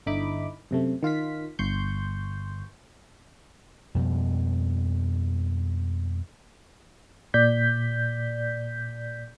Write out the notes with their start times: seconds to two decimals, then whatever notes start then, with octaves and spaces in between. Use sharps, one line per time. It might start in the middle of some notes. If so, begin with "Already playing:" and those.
0.06 G1 D3 D#4 E4 B5 D6
0.71 F#2 C3 A3
1.03 D#3 F4 F5 B6
1.59 G1 C6 C#6 G6
3.95 F2 B2 G3
7.34 A#2 D5 G6 B6